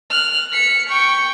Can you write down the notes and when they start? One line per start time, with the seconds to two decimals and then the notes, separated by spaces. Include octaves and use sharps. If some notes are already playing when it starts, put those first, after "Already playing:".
0.10 F6 F#6
0.53 B6 C#7
0.89 G5 C#6